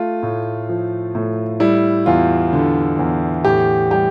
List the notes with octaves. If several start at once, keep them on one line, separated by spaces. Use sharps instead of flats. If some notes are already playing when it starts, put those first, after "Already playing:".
Already playing: A3 F4
A2
F3
A2
G3 E4
E2 F4
D3
E2
A2 G4
G3 G4